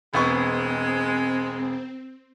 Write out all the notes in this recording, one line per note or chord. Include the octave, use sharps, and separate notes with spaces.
E1 G#3 B3 C4 C#6